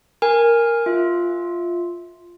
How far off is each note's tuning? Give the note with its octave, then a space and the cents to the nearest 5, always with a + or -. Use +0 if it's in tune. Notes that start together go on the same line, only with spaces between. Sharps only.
A#4 +0 G#5 -15
F4 +0 E5 -15